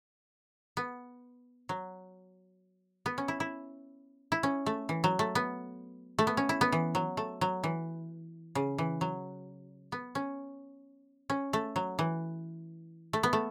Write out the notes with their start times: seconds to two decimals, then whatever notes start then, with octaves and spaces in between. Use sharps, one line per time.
0.77 B3
1.69 F#3
3.06 B3
3.18 C#4
3.28 E4
3.40 E4
4.32 E4
4.43 C#4
4.66 A3
4.89 E3
5.04 F#3
5.19 A3
5.35 B3
6.19 A3
6.27 B3
6.37 C#4
6.49 E4
6.61 B3
6.72 E3
6.95 F#3
7.17 A3
7.41 F#3
7.64 E3
8.55 C#3
8.78 E3
9.01 F#3
9.92 B3
10.15 C#4
11.30 C#4
11.53 A3
11.76 F#3
11.99 E3
13.13 A3
13.23 B3
13.33 A3